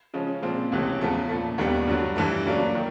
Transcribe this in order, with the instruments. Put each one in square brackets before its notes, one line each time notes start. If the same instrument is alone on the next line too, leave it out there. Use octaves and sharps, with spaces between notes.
[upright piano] C#3 F3 G#3 C#4
A#2 F3 G#3 C4 F4
C#2 C3 E3 A3 C#4
E2 C#3 F3 A3
A#2 F3 A3
D#2 D#3 G3 B3 D4
G2 D3 F#3
G2 E3 A3
C#3 F#3 A#3 D4
D#3